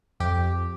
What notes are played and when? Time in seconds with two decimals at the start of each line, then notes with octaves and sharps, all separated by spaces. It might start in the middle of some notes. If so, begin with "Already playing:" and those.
0.20 F2 G4